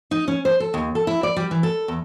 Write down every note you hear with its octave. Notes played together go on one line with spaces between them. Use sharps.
D#4
C#4
C5
A4
D#2
A4
E4
D5
G3
E3
A4
E2